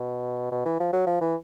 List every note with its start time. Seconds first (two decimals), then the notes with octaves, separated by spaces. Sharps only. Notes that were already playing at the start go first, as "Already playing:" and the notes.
Already playing: B2
0.52 B2
0.66 E3
0.80 F3
0.93 F#3
1.07 F3
1.21 E3